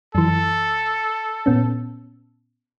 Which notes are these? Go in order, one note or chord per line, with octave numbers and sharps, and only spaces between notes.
F#2 E3 A4
A#2 B3 C#4